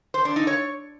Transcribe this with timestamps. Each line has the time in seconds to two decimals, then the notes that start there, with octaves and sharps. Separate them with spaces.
0.14 C5
0.25 D4
0.36 D#4
0.47 C#5